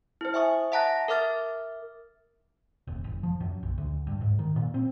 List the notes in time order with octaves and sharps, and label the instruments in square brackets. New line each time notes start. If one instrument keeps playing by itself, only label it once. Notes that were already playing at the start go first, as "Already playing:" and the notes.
[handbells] E4 C5
E5 G#5 C#6 D#6
E5 F#5 A5 A#5 F#6 A#6
A#4 E5 D6 F6 A6
[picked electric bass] D#1
F#1
F3
F#2
A#1
D2
G2
G#2
D#3
A#2
C4